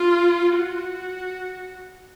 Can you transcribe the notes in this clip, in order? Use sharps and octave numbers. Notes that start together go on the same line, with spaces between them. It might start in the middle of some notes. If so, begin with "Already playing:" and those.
Already playing: F4
F#4